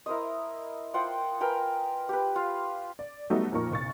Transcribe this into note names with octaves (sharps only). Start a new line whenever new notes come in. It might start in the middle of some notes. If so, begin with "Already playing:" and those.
E4 A#4 C5 D#5
F4 C5 F#5 G5
A#4 B4 G5 G#5
G4 B4
F4 F5
D5
F#3 G3 A3 B3 D#4 F#4
F2 A#2 D#4 A#4 C#6
F#1 B1 C#6 A6